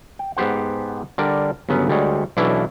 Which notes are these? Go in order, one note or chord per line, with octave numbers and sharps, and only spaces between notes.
G5
G#2 B3 G4 C5 F#5
D3 G3 A#4 D5
G1 C#3 F#3 B3 C#4
D2 G3 G#3 C#5
B1 B2 E3 C#4 D4 E4